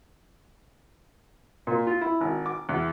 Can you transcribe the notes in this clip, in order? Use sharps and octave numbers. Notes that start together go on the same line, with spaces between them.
A#2
F4
E4
G#1
D6
E2